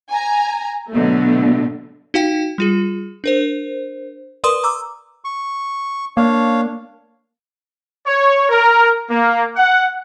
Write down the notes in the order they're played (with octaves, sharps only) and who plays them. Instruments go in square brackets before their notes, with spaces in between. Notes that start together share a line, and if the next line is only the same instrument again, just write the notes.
[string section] G#5 A#5
B2 D3 F#3 A3
[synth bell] D#4 F#4 F5 G5
G3 F4 G#4
D4 A#4 C5
A#4 B4 D5 C6 D#6
A#5 D6 E6
[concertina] C#6
[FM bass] A#3 [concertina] D4 C#5 F5
[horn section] C#5
A#4
A#3
F#5